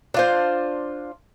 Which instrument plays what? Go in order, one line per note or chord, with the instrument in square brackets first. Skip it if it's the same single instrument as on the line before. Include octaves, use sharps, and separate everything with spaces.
[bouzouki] D4 F4 C5